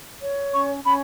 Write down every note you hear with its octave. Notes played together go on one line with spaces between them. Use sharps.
C#5
C#4 C#6
C#4 B5